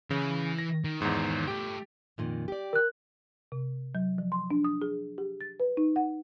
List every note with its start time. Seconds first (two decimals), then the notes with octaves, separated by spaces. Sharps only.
0.11 C#3 E3
0.58 A#6
0.84 D#3
1.02 E2 G#2 D#3 C#5
1.47 A3 G4 G5
2.18 F2 A#2 D#3
2.48 G4 D5
2.73 A#4 F#6
3.52 C3
3.95 F#3
4.18 F3
4.32 C6
4.51 D4
4.64 D#6
4.82 G#4
5.18 G4
5.41 A6
5.60 B4
5.77 D#4
5.96 F#5